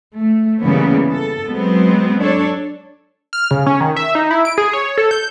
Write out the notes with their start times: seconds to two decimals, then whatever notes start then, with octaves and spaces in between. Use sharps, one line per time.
0.17 A3
0.62 C#3 E3 G3 A#3 B3 C#4
1.12 A4
1.48 F#3 G#3 B3 C4
2.21 D4 A4 C#5
3.33 F6
3.51 C#3
3.66 C#4
3.81 D#3
3.96 E5
4.15 D#4
4.31 E4
4.45 D7
4.58 G#4
4.73 C#5
4.98 A4
5.11 G6